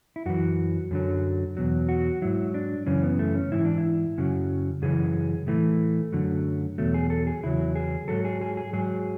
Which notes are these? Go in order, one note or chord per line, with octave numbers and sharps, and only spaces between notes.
E4
F#2 E3 F#4
F#2 D3 F#3
E2 B2 F#3
F#4
G#2 F#3 E4
D4
F#2 C#3 E3 C#4
B3
A3
C#4
G#2 E3 E4
D4
E4
F#2 C#3 F#3
F#2 C#3 E3 G#4
A2 E3 A3
F#2 D3 F#3
E2 B2 F#3 A3
G#4
A4
G#4
E2 C#3 F#3 E4
G#4
G#2 F#3 A4
G#4
G#4
G#4
G#2 F#3 G#4